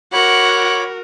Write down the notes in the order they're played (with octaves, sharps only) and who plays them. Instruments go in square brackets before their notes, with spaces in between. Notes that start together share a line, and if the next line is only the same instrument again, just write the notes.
[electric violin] F#4 A#4 [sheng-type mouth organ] C#5 B5 D6 [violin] F#5